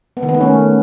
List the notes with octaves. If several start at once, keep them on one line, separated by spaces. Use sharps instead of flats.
B3
D#3
B3
A3
C#4